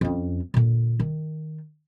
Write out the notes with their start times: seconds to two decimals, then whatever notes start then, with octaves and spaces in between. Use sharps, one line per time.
0.01 F2 C#4
0.54 A#2 D3
1.00 D#3